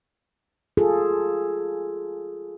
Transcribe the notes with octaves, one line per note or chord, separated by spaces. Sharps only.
F4 G#4 A4